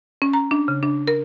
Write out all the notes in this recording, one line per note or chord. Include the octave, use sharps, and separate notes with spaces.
C#4
A#5
D4
C#3
D4
A#4